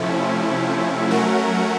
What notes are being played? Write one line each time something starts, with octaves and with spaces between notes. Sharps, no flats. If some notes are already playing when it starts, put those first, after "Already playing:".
Already playing: C3 F3 A3 C#4 E4
F#3 A3 C#4 F#4 A#4